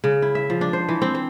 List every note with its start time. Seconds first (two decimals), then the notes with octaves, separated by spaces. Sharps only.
0.04 C#3
0.22 E4
0.35 E5
0.50 F3
0.61 D4
0.73 C5
0.89 E3
1.02 C4
1.15 C5